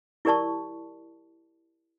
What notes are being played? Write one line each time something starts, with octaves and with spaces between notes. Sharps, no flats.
E4 G4 A#4 D5 A5 C#6